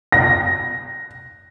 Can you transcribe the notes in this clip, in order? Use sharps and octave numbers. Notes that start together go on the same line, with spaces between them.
A#6